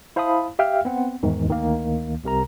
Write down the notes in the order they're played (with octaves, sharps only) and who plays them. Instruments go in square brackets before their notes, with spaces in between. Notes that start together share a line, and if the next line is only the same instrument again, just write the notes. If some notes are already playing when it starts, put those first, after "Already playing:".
[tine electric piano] E4 C5 F5 A5 B5 D#6
G4 E5 F5 G5 F6
B3 C4 F#5
E2 G#2 D#3
D2 D#3 A#3
C2 C3 A#4 A#5